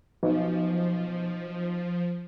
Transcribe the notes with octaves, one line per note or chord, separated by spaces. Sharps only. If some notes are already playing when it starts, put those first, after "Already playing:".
B1 F3